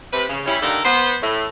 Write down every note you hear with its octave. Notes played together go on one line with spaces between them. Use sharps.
C3 B4
C#3
G3 C#4 E4
D3 D#3 G3 A#3 A4 A#4
B3 C5
A2